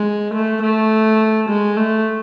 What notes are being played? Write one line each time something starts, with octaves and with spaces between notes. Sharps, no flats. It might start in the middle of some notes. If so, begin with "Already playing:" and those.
Already playing: G#3
A3
A3
G#3
A3